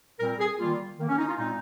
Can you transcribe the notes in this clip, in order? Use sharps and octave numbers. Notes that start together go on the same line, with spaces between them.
A#2 G3 C4 A#4
G#4
D#3 G3 A#3 F4
D#3 A#3
C#4
D#4
F4
A#2 G#3 C4 D#4